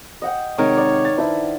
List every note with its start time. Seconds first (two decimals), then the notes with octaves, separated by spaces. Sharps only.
0.22 D#5 F#5 G5
0.58 C3 D#3 G#3 A#4 C#5
0.77 D5
1.05 A6
1.18 D4 E4 B4 C5 E5